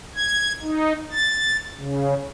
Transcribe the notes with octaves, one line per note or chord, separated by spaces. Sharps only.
G#6
D#4
A6
C#3